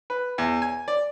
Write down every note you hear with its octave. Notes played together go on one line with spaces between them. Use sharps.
B4
E2
G#5
D5